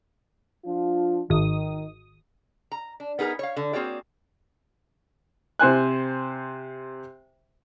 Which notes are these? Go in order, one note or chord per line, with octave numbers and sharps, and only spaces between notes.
F3 D4 F4
G#1 D#3 D#6
A#5
D4
B3 D#4 G#4 A#4
C#5 F5
D3
A#3 C4 F#4 G#4 C#5 D5
C3 C5 G#5 F#6